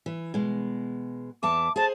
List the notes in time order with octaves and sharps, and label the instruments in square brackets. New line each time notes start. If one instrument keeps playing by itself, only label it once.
[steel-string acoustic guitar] E3
B2 G#3
[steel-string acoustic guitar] E2 E5 A5 [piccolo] D6
[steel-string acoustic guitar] G#4 C5 [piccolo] A5